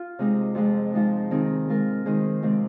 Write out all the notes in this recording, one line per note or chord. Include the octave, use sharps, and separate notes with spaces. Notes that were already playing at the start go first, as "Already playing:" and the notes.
Already playing: F4
C3 G#3 D#4
F2 F3 G#3
F3 G#3 D#4
D#3 C4 D#4 G#4
G#3 F4 A#4
D#3 G#3 D#4 G#4 C5
C3 F3 G#3 C4